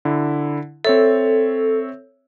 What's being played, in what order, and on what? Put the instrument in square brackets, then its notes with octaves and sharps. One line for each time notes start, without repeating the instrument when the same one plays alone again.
[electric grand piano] D3 E4
[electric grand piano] C4 C#5 E5 [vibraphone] A4